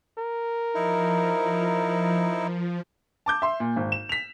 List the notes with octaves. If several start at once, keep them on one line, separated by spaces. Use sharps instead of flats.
A#4
F3 D#4 E4
A5 D6 G6
E5 C6
A#2
G#1
E7
B6 F7